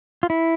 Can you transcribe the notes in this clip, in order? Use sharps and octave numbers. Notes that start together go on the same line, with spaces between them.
F4
E4